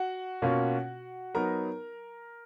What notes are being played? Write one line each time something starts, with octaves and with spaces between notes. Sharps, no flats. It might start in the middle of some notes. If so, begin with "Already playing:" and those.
Already playing: F#4 F#5
B2 A#3 C#4 F4
F#3 B3 D#4 A#4 A#5